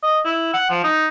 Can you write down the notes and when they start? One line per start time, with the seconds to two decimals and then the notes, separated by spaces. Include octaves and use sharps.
0.03 D#5
0.25 E4
0.54 F#5
0.70 F3
0.84 D#4